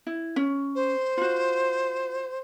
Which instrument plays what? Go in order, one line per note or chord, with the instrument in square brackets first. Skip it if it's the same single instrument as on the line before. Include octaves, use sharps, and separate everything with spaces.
[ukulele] E4
C#4
[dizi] C5
[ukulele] F4 F#4